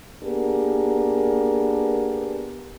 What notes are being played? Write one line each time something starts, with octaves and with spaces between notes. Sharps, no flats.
A#3 B3 D4 G4 G#4 A#4